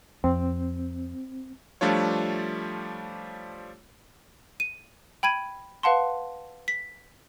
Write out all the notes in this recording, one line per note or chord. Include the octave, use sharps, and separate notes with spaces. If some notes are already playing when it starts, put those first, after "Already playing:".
F2 C4
F3 G3 A3 D4 F4 C#5
D#7
G5 B5 G#6 D#7
B4 F5 F#5 A5 C6
B6